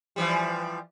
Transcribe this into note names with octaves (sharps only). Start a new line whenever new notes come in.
E3 F3 G3